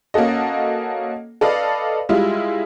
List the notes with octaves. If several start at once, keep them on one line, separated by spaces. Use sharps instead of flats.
A#3 C#4 F#4 A4 D#5
A4 B4 D5 D#5 F5
G3 G#3 E4 F4